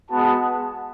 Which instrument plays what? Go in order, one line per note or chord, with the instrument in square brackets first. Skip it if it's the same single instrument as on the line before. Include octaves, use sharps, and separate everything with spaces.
[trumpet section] G#3 B3 F#4 A5